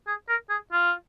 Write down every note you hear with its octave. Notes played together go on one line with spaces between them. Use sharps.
G#4
A#4
G#4
F4